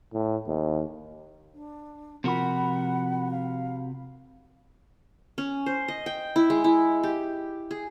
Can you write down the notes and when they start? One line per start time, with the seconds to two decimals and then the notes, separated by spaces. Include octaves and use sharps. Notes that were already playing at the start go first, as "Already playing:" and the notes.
0.13 A2
0.47 D#2
1.54 D4
2.24 C3 F3 F#4 A#4 F#5 B5
3.31 F5
5.38 C#4
5.66 C5
5.88 D#5
6.06 G5
6.36 E4
6.50 G#3
6.64 E4
7.03 G4
7.71 G#4